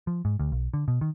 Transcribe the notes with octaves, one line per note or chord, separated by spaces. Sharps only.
F3
G#2
D2
B1
D3
B2
D#3